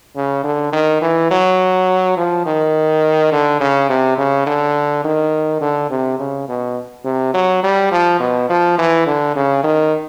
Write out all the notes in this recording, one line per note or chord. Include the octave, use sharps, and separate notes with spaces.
C#3
D3
D#3
E3
F#3
F3
D#3
D3
C#3
C3
C#3
D3
D#3
D3
C3
C#3
B2
C3
F#3
G3
F3
B2
F3
E3
D3
C#3
D#3